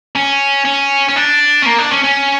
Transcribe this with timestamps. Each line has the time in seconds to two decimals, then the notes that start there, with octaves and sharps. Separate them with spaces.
0.15 C#4
0.65 C#4
1.09 C#4
1.16 D4
1.62 C#4
1.66 A#3
1.78 D4
1.92 C#4
2.04 C#4